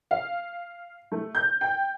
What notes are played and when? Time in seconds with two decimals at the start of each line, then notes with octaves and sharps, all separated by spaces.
0.11 F5
1.12 A3
1.35 G6
1.61 G5